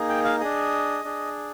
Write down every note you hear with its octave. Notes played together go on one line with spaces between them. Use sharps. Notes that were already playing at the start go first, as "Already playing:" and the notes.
Already playing: A#3 D#4 G#4
G5
F5
D4 G#4 D#5
D4 G#4